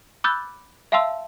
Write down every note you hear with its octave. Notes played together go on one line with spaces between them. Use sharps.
B5 D6 E6 F#6 G6 A6
E5 F5 G5 A5 C6 E6